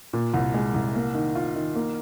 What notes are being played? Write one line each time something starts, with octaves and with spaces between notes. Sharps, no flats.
A#2
C2
G#3
C2
A#3
D#3
F4
D#3
A#3